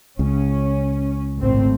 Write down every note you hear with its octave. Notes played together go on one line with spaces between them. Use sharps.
C#2 C#3 C#4
G#1 A2 C4